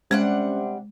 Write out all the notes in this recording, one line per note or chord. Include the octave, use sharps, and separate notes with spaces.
C3 G3 G#3 C#4 D4 F#5